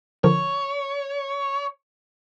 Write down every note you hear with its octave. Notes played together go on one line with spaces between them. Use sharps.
D3 F3 A#4 C#5